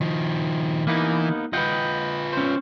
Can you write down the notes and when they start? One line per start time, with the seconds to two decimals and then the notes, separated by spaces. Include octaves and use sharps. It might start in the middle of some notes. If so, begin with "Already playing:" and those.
0.01 D#3 F3
0.87 E3 A#3 B3 D#4
1.53 F4 B4 D#5 F#5 G5
2.33 C#4 C5